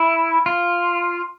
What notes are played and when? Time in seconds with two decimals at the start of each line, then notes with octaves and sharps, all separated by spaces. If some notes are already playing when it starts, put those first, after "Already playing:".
Already playing: E4
0.46 F4